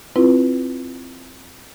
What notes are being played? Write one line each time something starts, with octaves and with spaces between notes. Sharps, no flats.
C4 E4 F4 B4